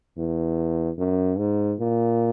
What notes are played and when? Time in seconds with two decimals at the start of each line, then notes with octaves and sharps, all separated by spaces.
0.17 E2
0.98 F#2
1.38 G#2
1.79 A#2